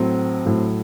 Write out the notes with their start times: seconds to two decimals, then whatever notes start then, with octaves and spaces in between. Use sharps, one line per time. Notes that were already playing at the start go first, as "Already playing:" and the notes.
Already playing: A2 F#3 C4
0.45 A2 F#3